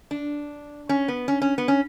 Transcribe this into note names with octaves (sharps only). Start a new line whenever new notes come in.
D4
C#4
B3
C#4
C#4
B3
C#4